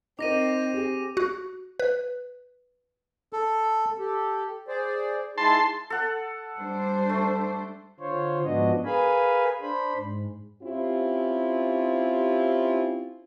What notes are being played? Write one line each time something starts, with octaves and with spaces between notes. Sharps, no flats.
C4 D#4 A#4 D6 A#6 D#7
G4 G#4
F#4
B4
A4
G4 A4
G#4 C5 D5
G#3 D#4 E4 A5 C6
A4 F#5
G3 D4 C5
A3
D3 F4 C5 C#5
G#2 F3 B3 D4 F#4 D#5
G#4 A#4 B4 F5 G#5 B5
D4 C5 B5
G#2
C4 C#4 E4 F4 G4